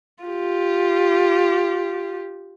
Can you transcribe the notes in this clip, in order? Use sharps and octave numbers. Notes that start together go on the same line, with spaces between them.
F4 G4